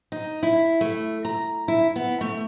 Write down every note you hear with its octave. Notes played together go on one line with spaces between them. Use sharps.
D#4
E4
A3
A#5
E4
B3
A3